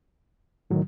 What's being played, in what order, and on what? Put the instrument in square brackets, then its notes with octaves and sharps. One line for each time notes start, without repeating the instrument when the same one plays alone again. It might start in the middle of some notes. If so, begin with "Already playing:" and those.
[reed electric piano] A2 F#3 [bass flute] D#3